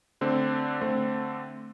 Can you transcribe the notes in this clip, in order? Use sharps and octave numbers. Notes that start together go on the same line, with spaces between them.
D3 A3 C4
D3 A3 C4